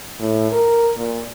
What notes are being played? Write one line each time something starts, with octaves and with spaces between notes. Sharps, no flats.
A2
A#4
A#2